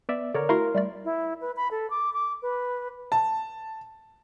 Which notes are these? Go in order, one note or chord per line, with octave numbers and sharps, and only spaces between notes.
B3 D5 E5
D3 A#4 C#5 D5
A3 E4 F#4 A#4 F5 C6
G3 A3 D5
E4
B4
B5
A4
D6
D6
B4
A5